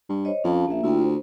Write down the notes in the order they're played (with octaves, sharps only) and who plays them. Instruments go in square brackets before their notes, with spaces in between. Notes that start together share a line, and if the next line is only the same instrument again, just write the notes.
[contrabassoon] G2
[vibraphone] C5 C#5 D#5
[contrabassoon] F2 [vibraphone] C#4 F5 A5
[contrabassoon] A#1 [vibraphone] A#3 E5
[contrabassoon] D2 [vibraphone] E4 F4 G5
[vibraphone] C5